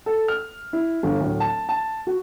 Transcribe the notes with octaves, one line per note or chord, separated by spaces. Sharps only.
A4
F6
E4
G1
D1
A5
A5
F#4